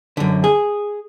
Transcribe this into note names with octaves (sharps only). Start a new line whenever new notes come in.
F#2 D3
G#4